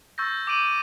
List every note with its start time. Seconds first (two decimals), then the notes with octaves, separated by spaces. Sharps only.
0.18 C#6 E6 G6 A6 A#6
0.47 D6 G6 G#6 D7 D#7 F#7